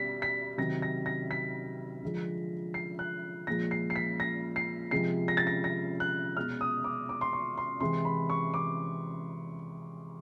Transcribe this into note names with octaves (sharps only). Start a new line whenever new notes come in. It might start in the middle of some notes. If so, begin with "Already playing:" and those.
Already playing: B2 G3 B6
B6
C3 D#3 F#3 A#6
A#6
A#6
B6
D3 F3 G#3
C7
F#6
A#2 F3 G#3 A#6
C7
C7
B6
A#6
C7
C3 F3 G#3 C7
A#6
A6
A#6
A#6
F#6
B2 G#3 F6
D#6
D6
D6
C6
C#6
C6
C3 E3 G#3 C6
B5
C#6
D6